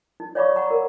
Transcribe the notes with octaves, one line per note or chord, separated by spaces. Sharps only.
D#4
C#5 D5 F5 B5 C#6 D6
F#5 A#5 C#6
A#4